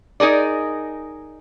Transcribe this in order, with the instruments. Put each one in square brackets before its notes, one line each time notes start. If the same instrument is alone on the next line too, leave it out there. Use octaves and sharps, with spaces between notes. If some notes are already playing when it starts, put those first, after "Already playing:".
[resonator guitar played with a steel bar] D#4 G#4 A#4 D5